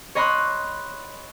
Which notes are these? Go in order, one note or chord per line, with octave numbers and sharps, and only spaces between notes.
C#5 D#5 B5 C6 F#6